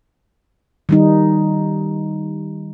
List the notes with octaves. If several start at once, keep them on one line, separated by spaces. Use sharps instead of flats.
D#3 G3 D#4